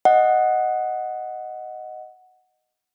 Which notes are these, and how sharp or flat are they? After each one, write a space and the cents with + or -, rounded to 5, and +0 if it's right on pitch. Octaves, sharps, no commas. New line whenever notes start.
D#5 +0 F#5 +0